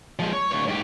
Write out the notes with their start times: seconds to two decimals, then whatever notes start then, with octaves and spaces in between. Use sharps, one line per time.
0.19 F3 G#3
0.33 C#5
0.52 D2 C#5
0.68 G#2 G4